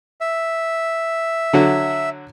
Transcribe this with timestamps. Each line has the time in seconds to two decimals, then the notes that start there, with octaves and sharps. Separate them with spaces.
0.21 E5
1.53 D3 F#3 F#4